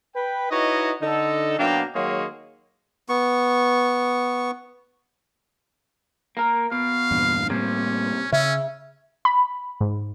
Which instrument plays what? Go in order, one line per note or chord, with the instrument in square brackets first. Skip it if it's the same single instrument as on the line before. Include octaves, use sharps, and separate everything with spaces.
[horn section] B4 G5
D#4 E4 F#4 B4 C#5 D#5
D3 D#4 A4
B2 F#3 A#3 D4 F5 G5
D#3 F#3 G#3 A#3 G#4 C#5
[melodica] B3 C#6
[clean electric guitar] A#3 A#4
[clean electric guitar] B2 [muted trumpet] F5
[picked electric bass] E2 G2 A#2
[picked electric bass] A2 G3 A#3 [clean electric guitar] C3 [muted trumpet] C#4
[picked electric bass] C#3 [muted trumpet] C#4 [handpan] E5
[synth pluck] B5
G#2